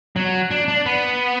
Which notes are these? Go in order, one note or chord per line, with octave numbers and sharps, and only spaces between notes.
F#3
D4
D4
B3